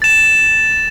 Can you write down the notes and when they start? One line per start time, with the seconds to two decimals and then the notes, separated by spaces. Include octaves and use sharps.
0.02 A6 E7